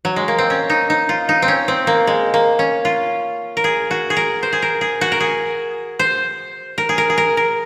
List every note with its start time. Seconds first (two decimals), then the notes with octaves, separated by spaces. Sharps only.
0.05 F#3
0.16 G#3
0.28 A#3
0.38 C4
0.50 C#4
0.70 D#4
0.90 D#4
1.09 F4
1.29 D#4
1.42 C4
1.48 C#4
1.68 C4
1.87 A#3
2.07 G#3
2.34 A#3
2.59 C#4
2.85 F4
3.57 A#4
3.64 G#4
3.91 F#4
4.10 G#4
4.16 A#4
4.43 C5
4.53 G#4
4.62 A#4
4.81 G#4
5.01 F#4
5.12 A#4
5.20 G#4
5.99 C5
6.78 A#4
6.89 G#4
6.98 A#4
7.10 G#4
7.18 A#4
7.37 A#4